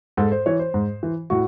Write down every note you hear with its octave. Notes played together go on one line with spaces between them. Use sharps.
G#2 A4
C5
E3 C#5
C5
G#2
E3
A2 F#4